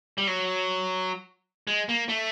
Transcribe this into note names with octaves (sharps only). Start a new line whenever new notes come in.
G3
F#3
G#3
A#3
A3